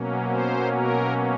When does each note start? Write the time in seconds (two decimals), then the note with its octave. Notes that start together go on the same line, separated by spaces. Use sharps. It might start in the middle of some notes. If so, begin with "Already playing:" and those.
Already playing: B2 F#3 A#3 C#4
0.28 C5
0.73 A#4